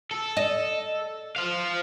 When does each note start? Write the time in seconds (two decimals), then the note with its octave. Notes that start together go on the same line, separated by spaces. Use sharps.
0.11 A4
0.37 D#5
1.36 C5 F5